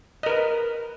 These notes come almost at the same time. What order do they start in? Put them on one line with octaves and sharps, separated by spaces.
D#5 A#4 B4